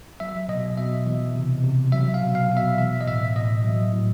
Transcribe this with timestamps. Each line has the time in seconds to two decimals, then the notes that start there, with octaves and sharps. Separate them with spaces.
0.20 F#3 E5
0.49 B2 D#5
0.77 B2 E5
1.07 E3
1.36 C3
1.64 C3
1.92 F#3 E5
2.14 F5
2.22 B2
2.35 F5
2.50 B2
2.57 E5
2.78 E3 E5
3.01 D#5
3.07 A2 E5
3.36 A2 D#5
3.64 F#3
3.93 A2